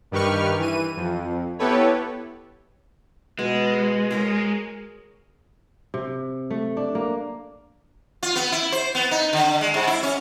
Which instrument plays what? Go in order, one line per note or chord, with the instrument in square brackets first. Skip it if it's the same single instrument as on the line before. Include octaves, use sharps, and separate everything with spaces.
[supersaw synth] G2 D#3 G4 B4 C#6 F6
E3 D#7
F2
B3 E4 G4 A4 B4 C#5
[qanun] B2 [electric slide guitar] G#3
[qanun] G#4 A#4 C#5
[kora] C3
A3
D4
A#3
[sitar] F4
B3
E4
C5
B3
D#4
D3
G#3
G#2
E4
C#4